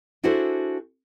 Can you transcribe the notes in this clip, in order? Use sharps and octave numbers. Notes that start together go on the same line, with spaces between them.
D4 E4 F#4 G#4 A4 C5